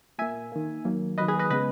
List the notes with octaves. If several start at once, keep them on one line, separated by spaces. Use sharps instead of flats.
A#2 A#3 E5 G#5
D#3 A#3
D#3 F#3 A#3
D#3 F#3 A#3 B4 D#5
G#4 B4
B4 D#5
C#3 G#3 B3 B4 D#5